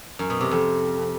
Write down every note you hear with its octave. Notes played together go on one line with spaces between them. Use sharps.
F#2
B2
C3
F2